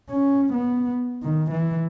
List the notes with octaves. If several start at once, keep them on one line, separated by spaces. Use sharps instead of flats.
C#4
B3
D#3
E3